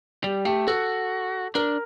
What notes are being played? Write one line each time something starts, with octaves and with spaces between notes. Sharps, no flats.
G3 G4
A3 G4
F#4 A4
D4 A#4